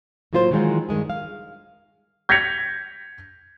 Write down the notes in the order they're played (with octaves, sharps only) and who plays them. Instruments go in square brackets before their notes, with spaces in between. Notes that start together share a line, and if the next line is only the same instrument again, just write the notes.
[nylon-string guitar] A2 F#3 A#3 F4 A#4 C5
D#3 E3 F#3 G#3 D#4 F4
G2 D#3 G#3 G#4
F5
[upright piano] G6 G#6 A#6 B6 C#7 F7